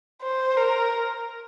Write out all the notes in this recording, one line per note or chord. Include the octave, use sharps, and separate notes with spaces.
C5
A#4